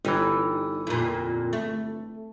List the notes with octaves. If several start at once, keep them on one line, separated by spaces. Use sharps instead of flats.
G1 E3 G3 D#4
F2 A#2
A3